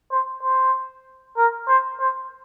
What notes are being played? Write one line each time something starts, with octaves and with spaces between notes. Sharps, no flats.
C5
C5
A#4
C5
C5